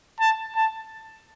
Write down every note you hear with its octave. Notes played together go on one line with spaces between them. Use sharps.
A5
A5